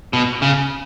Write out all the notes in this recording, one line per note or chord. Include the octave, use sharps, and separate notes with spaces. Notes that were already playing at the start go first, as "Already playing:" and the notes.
B2
C#3